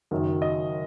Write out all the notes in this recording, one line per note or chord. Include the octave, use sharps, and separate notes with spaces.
F#1 F#2 D#3 F#3
D#5